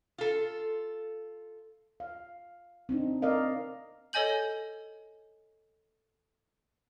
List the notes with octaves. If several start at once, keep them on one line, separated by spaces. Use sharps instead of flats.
F4 A4
F5
C4 D4 D#4
C4 A#4 D5 D#5 F5
A4 C#5 D#5 G#5 G6 F#7